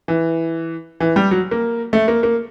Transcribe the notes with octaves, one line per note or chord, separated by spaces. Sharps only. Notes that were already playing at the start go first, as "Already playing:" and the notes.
E3
E3
G3
F#3
A#3
A3
A#3
A#3